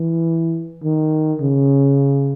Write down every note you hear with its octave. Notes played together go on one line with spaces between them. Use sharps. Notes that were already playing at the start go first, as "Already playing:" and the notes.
Already playing: E3
D#3
C#3